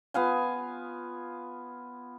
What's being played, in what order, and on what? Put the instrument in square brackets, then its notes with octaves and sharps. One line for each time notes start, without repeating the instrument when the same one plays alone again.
[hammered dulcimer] B3 F4 F5 G#5